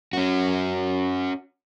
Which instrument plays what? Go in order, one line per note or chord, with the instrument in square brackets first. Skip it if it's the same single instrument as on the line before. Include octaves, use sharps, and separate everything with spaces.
[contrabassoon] F#2 [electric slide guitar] C#4 F#4